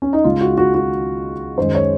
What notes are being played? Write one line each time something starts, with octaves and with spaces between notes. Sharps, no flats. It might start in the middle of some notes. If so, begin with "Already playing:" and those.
C#4
D#4
C#2 C#3 G#3 F4
F#4
F#4
F#4
F#2 D#3 G#3 C5
C#5